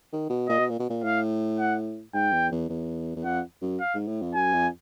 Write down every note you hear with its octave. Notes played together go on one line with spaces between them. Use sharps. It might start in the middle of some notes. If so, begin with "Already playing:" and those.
D#3
B2
A#2 D#5
B2
A#2
B2
A#2
A2 F5
F#5
G#2 G5
E2
E2
E2
E2
F2 F#5
F#2
F5
G#2
A2
F2
F#2 G#5
F2